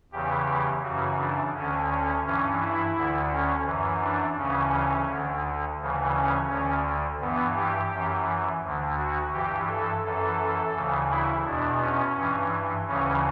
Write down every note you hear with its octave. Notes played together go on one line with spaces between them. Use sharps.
E2 C#3 E3 G4
F#2 C#3 E3 F#4
D4
D2 D3 C#4
C#4
G2 E3 C#4
E4
D2 D3
C#4
F#2 E3
D4
D2 C#3 E3 C#4
D2 D3
D2 C#3 E3
C#4
D2 D3 C#4
G2 E3 B3
G4
F#2 E3
D2 D3
F#4
G2 E3 G4
A4
F#2 E3 A4
D2 C#3 E3
E4
E2 B2 D4
C#4
G2 E3
D2 C#3 E3 C#4